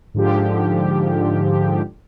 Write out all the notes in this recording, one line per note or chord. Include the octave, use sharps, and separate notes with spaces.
G#2 D3 F3 G4